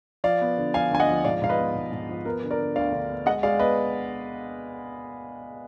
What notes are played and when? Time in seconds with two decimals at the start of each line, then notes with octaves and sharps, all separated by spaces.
0.24 F3 D5 F5
0.41 B3
0.58 D3
0.74 F3 F5 G#5
0.91 D2 G#5
1.00 D#5 F#5
1.08 F3
1.24 G#2 D5 F5
1.42 G#2 F5
1.49 B4 D#5
1.58 B3
1.75 G#2
1.92 G#2
2.09 F3
2.25 B3 A#4
2.43 D3
2.50 A#4 D5
2.59 D3
2.76 D2 D5 F5
2.92 D3
3.09 B3
3.26 G#3 D#5 F#5
3.43 G#3 D5 F5
3.59 B3 B4 D#5